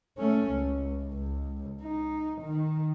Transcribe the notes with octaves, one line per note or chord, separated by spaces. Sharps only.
A3 C#4
C#2
C#2
D#4
D#3